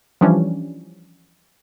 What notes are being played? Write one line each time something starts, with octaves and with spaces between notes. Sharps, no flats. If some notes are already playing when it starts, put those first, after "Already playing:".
E3 F3 G3 C#4 D4